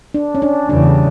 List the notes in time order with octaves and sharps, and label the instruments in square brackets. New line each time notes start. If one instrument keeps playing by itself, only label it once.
[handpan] D4
C#4
D4
[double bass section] E2 C#3 E3 G3 [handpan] D4